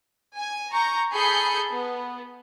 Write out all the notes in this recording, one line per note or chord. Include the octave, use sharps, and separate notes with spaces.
G#5
A#5 C#6 G6
G#4 A4 B5 G6 C7 C#7
B3